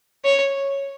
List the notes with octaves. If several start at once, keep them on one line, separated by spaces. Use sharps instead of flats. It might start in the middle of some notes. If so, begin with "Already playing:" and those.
C#5